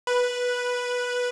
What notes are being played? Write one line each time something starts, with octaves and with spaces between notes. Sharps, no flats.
B4